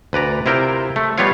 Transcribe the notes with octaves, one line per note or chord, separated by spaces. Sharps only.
D2 B4 D5 A#5
C3 E4 F4 A#4 G5
A3
G3 B3 F4 C#5 F5